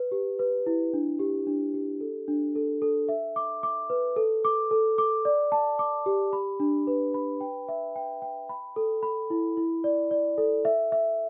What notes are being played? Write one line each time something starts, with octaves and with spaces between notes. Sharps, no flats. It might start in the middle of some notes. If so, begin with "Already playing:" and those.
Already playing: B4
G4
B4
E4
D4
G4
D4
G4
A4
D4
A4
A4
E5
D6
D6
B4
A4
D6
A4
D6
D5
A5
D6
G4
B5
D4
B4
B5
G5
E5
G5
G5
B5
A4
B5
E4
E4
D5
D5
A4
E5
E5